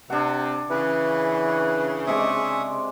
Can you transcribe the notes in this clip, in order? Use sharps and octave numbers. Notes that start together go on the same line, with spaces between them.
C3 D4 F#5
C#3 E3 B4
C3 G#3 D5 E5 C#6 D#6